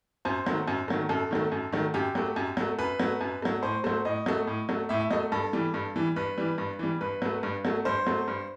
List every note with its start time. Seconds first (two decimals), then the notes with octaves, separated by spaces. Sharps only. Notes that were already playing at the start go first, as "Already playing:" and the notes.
0.25 F#2 C5
0.46 D#3 F#3 A3
0.68 F#2
0.88 D#3 F#3 A3
1.09 F#2 A4
1.31 D#3 F#3 A3
1.52 F#2
1.72 D#3 F#3 A3
1.94 F#2 G4
2.15 F#3 A3
2.36 F#2
2.57 F#3 A3
2.79 F#2 B4
3.00 F#3 A3
3.21 F#2
3.42 F#3 A3
3.62 A2 C5
3.84 F#3 A3 C5
4.05 A2 D#5
4.26 F#3 A3
4.47 A2
4.69 F#3 A3
4.89 A2 E5
5.00 E5
5.10 F#3 A3 D#5
5.32 G2 A4
5.53 E3 G3
5.74 G2
5.96 E3 G3
6.16 G2 B4
6.37 E3 G3
6.58 G2
6.79 E3 G3
7.01 G2 B4
7.22 F#3 A3
7.43 G2
7.65 F#3 A3
7.85 G2 C5
8.07 F#3 A3
8.28 G2